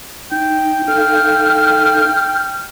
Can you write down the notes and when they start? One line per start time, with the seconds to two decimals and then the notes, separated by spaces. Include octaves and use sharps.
0.32 D#4 G5
0.88 D#4 A4 F5 F6